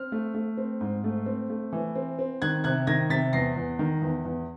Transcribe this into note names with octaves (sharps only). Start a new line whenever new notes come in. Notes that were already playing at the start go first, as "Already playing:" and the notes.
Already playing: C4 F6
A3
A3
C4
G#2
A3
C4
A3
E3
C4
C4
D#3 F#6 G#6
C3 F#6 G#6
D#3 G#6 A#6
C3 A6 B6
E2 A#6 C7
E2
D#3
E2
E2